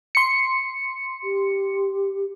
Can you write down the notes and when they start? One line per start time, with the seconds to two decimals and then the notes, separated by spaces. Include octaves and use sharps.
0.15 C6 C#7
1.23 G4